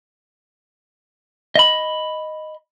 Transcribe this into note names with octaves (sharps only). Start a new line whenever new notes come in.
D#5 B5